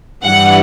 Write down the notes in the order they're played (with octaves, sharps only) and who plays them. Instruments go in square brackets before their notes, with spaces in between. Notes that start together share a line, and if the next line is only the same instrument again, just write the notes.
[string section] G2 E3 G3 F#5